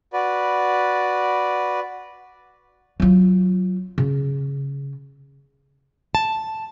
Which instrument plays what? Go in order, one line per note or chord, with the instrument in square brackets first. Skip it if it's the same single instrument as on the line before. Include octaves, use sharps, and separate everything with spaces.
[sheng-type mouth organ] F#4 B4 D5
[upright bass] F#3 F4
C#3
[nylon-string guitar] A5